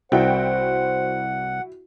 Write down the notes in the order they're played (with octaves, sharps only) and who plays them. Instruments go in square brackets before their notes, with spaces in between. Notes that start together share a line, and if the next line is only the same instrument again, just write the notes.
[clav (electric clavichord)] C2 [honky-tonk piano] E4 F#4 G5 [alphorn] C5 [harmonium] F#5